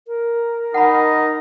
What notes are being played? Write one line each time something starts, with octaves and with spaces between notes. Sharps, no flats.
A#4
D#4 D#5 F#5 A5 B5